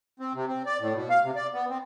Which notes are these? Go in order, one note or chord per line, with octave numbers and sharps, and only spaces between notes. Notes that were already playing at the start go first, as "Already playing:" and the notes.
C4
C3
C4
D5
A2
B2
F5
C3
D5
B3
C4